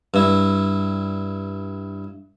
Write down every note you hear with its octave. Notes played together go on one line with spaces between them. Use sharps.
G2 E4